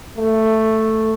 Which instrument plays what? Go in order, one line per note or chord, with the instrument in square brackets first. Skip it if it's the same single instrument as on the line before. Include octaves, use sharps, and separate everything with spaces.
[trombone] A3